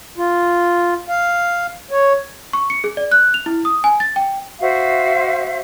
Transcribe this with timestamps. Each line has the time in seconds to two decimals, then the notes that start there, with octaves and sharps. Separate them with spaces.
0.18 F4
1.08 F5
1.91 C#5
2.53 C#6
2.70 C#7
2.84 G#4
2.97 D5
3.11 F#6
3.34 F7
3.46 E4
3.65 D#6
3.84 G#5
4.00 A6
4.16 G5
4.61 F#4 C5 E5 F5